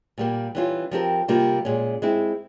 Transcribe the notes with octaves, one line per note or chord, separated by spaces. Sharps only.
A#2 G3 A#3
E3 G3 C#4 F4
F3 C4 G4 A#4
C3 G3 A#3 F4 A#4
A#2 G#3 C#4
G#3 C4 E4